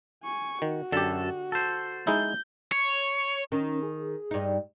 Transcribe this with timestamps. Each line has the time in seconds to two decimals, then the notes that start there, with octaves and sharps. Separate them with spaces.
0.24 G#5 C#6
0.62 D#3 F#4
0.92 F#2 D3 G4 A4
1.52 A4 C5
2.07 G#3 D#4 E4 G6
2.72 C#5
3.52 D#3 C#4
3.82 G#4
4.31 G2 D#4